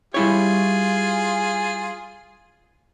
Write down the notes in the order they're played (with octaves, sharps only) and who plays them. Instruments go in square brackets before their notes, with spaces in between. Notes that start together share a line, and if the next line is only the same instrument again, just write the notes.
[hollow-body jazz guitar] G3 E4 C#5 [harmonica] F4 G#4